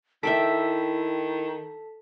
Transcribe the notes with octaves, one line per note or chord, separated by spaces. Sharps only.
D#3 E4 A4 E5 G5 A5 D6 B6